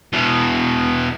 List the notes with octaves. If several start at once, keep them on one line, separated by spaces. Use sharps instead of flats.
E2 B2